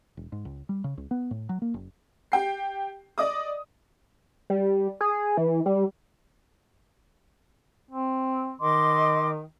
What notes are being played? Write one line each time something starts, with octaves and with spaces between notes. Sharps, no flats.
E1
G#2
C#2
G3
C#3
C#2
B3
A2
F#3
A#3
F#1
G4 G5 C7
D5 D#5 D6 D#6
G3
G#4
E3
G3
C4
D#3 D#5 C6 D6